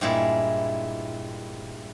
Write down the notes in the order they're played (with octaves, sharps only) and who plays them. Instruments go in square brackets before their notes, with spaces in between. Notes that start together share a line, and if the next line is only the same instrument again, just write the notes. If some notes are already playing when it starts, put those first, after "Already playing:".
[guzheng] G2 A#2 G#3 E4